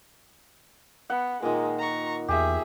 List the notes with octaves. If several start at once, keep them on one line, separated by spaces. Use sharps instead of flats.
B3 F#5
A#2 D#3 G#3
A#5 C#6
E2 G4 G#4 E5